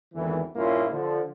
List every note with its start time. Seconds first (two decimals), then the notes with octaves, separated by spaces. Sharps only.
0.14 G#1 E2 D3 E3
0.55 A#1 G2 A#3 C#4 E4 F4
0.90 D3 F3